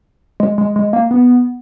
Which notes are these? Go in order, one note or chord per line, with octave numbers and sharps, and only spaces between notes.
G#3
G#3
G#3
A#3
B3